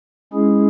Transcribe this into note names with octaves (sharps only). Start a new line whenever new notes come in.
G#3 C#4 E4 G#4